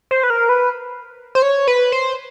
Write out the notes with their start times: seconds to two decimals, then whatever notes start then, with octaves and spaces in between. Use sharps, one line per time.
0.11 C5
0.23 B4
0.30 A#4
0.49 B4
1.35 C5
1.42 C#5
1.67 B4
1.92 C5